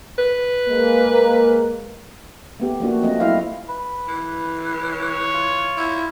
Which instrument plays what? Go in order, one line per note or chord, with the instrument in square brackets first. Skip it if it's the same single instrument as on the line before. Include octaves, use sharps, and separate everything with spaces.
[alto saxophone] B4
[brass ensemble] G#3 A#3
[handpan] A3 B3 G4
F3 A#3 D4 F#4
F3 A3 C4 D#5
F#3 E4 C5 D#5 F5
[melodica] B4
[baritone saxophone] E3
[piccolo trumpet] C#5
[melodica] F4
[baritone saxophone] E4